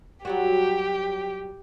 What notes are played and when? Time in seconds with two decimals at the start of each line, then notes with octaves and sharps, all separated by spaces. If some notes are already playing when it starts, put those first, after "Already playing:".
0.25 F#3 G3 F#4 G4